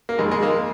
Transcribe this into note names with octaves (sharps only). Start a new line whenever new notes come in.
A#3
F2 D#3 G#3
G#3
A#3